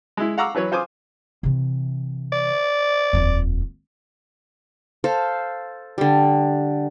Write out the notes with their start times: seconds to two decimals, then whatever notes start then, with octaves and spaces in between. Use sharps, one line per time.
0.17 G#3 E4
0.38 F5 F#5 A#5 C#6 D6 E6
0.54 E3 F#3 B4 C#5
0.72 F4 C5 G#5 D6 D#6
1.43 C3 E3
2.33 D5
3.13 D#1 F2
5.04 A4 C5 F5
5.98 D3 G3